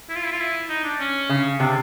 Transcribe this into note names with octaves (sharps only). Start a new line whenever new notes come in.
E4
F4
E4
F4
E4
D#4
D4
C#4
C#3
C3 D4